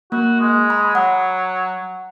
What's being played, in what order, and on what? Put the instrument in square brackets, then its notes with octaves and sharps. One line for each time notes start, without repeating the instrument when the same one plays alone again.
[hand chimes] A#3 [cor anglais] F#4
[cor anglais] G#3
[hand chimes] B5
[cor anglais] F#3 [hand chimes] F#5